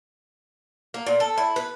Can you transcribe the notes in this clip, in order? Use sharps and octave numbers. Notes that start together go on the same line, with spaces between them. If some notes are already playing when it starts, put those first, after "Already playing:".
A#3
A#2
A4
E4
B4